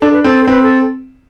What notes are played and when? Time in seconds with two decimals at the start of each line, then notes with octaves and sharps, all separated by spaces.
0.01 D4 A4
0.13 B4
0.23 C4 A4
0.43 C5
0.47 C4 B4
0.63 A4